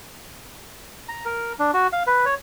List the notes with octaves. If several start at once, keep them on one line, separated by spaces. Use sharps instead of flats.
A#5
A#4
D4
F#4
F5
B4
C#5